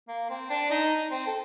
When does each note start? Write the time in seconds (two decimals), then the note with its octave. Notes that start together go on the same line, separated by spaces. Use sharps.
0.08 A#3
0.30 C4
0.50 D4
0.71 D#4
1.11 C4
1.27 A4